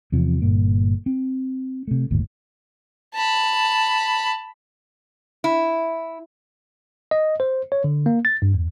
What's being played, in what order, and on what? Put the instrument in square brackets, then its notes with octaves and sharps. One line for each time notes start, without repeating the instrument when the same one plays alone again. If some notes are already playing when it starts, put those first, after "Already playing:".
[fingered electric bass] E2 C3 F3
G1 G2 A#2 A#3
C4
C3 A3
G1 D#2 A2
[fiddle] A5 B5
[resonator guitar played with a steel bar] E4
[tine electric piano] D#5
C5
C#5
D3
A#3
A6
G2
E2